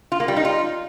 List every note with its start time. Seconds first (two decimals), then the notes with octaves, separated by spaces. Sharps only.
0.12 F4
0.20 A#3
0.28 G3
0.36 D#4
0.45 F4